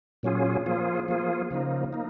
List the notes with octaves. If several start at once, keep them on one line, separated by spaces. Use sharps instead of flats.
A#2 F#3 C#4 F4 G#4
F3 A#3 F4 G#4
F3 A#3 F4 G#4
C#3 F3 A#3 D#4
A#3 D#4